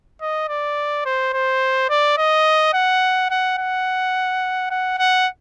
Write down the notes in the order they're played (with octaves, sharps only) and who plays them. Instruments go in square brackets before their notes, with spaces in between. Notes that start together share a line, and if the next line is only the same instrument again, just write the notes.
[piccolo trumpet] D#5
D5
C5
C5
D5
D#5
F#5
F#5
F#5
F#5
F#5